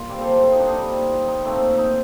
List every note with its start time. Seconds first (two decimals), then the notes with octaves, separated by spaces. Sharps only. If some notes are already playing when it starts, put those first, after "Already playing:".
Already playing: G2 A#3 F4
0.09 A#2 G3 C4 D5 F5
0.21 A4 C5
0.32 G4 A#4
0.43 F4 A4
0.52 D#4
0.60 D4 F4
0.68 D#4
0.77 A#2 G3 C4
1.28 D#4
1.45 A#2 A3 C4
1.78 D#4